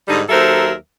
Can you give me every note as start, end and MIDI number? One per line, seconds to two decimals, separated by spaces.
0.08 0.22 44
0.08 0.22 50
0.08 0.22 55
0.08 0.22 63
0.29 0.73 39
0.29 0.73 54
0.29 0.73 69
0.29 0.73 70
0.29 0.73 72
0.29 0.73 76